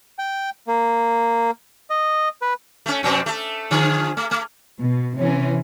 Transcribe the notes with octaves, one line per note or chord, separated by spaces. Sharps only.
G5
A#3
D#5
B4
A3 C#4
F2 B2 C4
A3 A4
D3 F3 G#4
A3
A3
B2
C3 E3 C#4